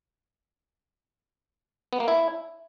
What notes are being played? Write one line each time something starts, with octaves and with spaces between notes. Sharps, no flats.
B3
A#3
E4